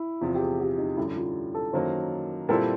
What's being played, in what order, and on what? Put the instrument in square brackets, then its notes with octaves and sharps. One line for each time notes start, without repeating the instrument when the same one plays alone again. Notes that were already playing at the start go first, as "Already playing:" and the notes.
Already playing: [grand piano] E4
[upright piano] E2 C3 F3 [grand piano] E4
[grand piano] G4
G#4
G4
D#4
[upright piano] F#2 D3 G3 [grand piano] E4
[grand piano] F4
A4
[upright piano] F#2 D#3 F#3 A#3 [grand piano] C5
[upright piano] A#2 G3 C4 E4 A4 [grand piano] A#4